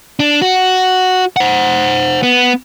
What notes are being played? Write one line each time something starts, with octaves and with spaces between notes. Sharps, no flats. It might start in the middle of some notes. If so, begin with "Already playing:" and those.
D4
F#4
C5 F#5
B3